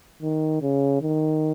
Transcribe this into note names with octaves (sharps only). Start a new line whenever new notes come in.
D#3
C#3
D#3